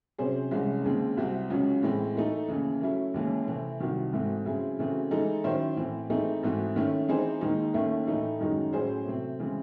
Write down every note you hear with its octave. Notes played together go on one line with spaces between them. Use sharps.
C3 F#3 C#4 G#4 C5
C2 C3 E3 G#3 C#4
D#2 C#3 G#3 C4
C2 C3 F#3 C4 F#4
C#2 C#3 F#3 C#4
A2 E3 G#3 C4
E3 A3 D#4 A4
D#2 C#3 E3
F#3 A3 C#4 E4
D#2 C#3 E3 G#3 C#4
C3 E3 A3 C4
C2 C3 D#3 F#3
G#2 E3 A3 C4 F#4
C#3 F#3 C4 E4 G#4
C#3 E3 A3 C4 F#4
E3 G#3 D#4 A4
D#3 F#3 C#4 E4 C5
A2 E3 C4
E3 A3 C4 D#4 G#4
G#2 E3 A3 C4 F#4
D#3 A3 C#4 E4
E3 C4 D#4 G#4 C5
D#2 D#3 G#3 D#4
D#2 D#3 A3 C#4 E4
A2 E3 A3 D#4
F#2 D#3 G#3 D#4 F#4
A2 F#3 C#4 G#4 C5
C3 F#3 A3 C4
C#3 E3 G#3 C4